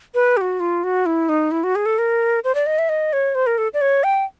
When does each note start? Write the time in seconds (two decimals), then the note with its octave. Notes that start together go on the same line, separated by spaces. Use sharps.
0.14 B4
0.37 G4
0.41 F#4
0.60 F4
0.84 F#4
1.06 E4
1.29 D#4
1.51 E4
1.64 F#4
1.76 G#4
1.86 A4
1.98 A#4
2.44 C5
2.55 D5
2.66 D#5
2.79 E5
2.89 D#5
3.13 C#5
3.35 C5
3.47 A#4
3.58 A4
3.74 D5
3.81 C#5
4.04 G5